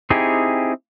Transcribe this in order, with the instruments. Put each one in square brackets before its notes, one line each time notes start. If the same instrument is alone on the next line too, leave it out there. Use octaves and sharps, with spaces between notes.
[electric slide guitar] C4 D#4 E4 G4 G#4